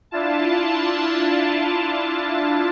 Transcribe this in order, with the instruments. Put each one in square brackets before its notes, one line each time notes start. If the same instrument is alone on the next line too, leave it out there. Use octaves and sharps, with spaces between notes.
[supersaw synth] D4 E4 F4 A5